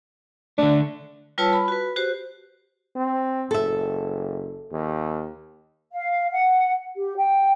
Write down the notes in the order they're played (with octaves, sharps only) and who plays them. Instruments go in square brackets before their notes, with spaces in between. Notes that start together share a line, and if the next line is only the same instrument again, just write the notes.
[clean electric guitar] D3 A3 [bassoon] D4
[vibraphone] G3 F4 B4 C#5 A5 E6
B5
F#4 B4
F#4 G4 C5
[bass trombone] C4
[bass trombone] F#1 [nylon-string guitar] A4 E5
[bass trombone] D#2
[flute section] F5
F#5
G4
G5